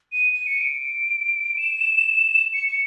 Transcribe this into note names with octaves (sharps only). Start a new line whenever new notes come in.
D#7
D#7
C#7
D7
E7
C#7
C#7